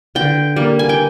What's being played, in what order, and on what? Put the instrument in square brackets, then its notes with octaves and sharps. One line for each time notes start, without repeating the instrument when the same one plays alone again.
[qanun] D3 G5
G3 A#3
G#5
G5